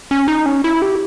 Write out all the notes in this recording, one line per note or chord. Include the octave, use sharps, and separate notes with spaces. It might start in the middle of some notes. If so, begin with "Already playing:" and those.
C#4
D#4
C#4
E4
G4